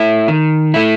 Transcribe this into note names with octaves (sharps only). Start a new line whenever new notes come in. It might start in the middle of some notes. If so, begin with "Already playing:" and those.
Already playing: A3 E4
D#3
A3 E4